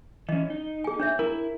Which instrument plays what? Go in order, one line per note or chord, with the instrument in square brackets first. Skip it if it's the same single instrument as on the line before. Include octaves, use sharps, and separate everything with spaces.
[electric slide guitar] E3 C#4 [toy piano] D#5
[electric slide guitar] D#4
[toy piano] G#4 G#5
D4 C#5 E5
[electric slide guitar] E4 [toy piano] A#4 A#5